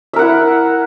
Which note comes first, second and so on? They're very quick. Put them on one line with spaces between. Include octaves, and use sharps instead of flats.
E5 A#4 F#5 E4